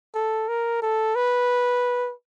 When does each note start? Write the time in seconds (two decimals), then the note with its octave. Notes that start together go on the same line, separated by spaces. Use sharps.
0.14 A4
0.48 A#4
0.82 A4
1.16 B4